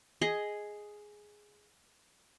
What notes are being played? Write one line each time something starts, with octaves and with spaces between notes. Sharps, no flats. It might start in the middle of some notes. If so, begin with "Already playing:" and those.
G#4 D#5